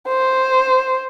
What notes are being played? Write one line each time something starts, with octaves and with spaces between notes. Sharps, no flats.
C5